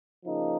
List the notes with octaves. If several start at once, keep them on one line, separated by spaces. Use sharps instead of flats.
C#3 F3 A#3 D#4